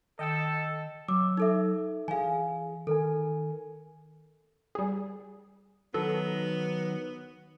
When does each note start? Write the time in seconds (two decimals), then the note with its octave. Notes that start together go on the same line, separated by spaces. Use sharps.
0.19 D#3 A4 D#5 G5 E6
1.08 F#3 D6 E6
1.37 D#4 A4 E5
2.08 E3 G#4 F5 G#5
2.87 D#3 A4 A#4 G#5
4.75 G3 G#4
5.94 D#3 F#3 B3 A4